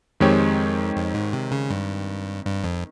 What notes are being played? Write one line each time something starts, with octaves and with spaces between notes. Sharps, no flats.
F2 D#3 G#3 C4 G4 C#5
F2
G#2
C3
C#3
G2
G2
F2